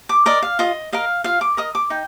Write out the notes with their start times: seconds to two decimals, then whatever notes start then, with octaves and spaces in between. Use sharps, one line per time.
0.09 D6
0.26 A#4 D5 D#5
0.42 F5
0.59 F4 D#5
0.93 A#4 D#5 F5
1.24 F4 F5
1.41 D6
1.57 A#4 D#5 D#6
1.75 D6
1.90 D#4 G5